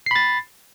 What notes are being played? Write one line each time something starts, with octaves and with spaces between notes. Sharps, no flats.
B5 A6 C7